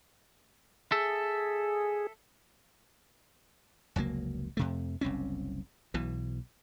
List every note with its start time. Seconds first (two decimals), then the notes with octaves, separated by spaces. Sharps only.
0.92 G#4 A4 E5
3.96 F1 C#2 F#3 A#3
4.57 F2 C3 A3
5.01 F#1 C2 C4 C#4
5.94 B1 B2 E3